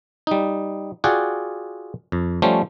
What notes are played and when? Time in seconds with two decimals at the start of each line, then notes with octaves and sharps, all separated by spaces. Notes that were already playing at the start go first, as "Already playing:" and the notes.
0.27 G3 D#4
1.04 F4 F#4 G#4 D5 F#5 G5
2.12 F2
2.42 F3 G3 A3 C#4 C5